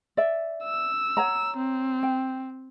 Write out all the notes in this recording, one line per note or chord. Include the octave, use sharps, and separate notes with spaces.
D5 E5
E6
C#5 F#5 A#5
C4
G5